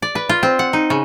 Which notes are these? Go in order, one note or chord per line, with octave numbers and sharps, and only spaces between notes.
D5
B4
F4
C4
F#5
D#4
C#3